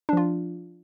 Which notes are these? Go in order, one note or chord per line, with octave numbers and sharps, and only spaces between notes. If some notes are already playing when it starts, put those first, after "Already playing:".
F3 D4 F4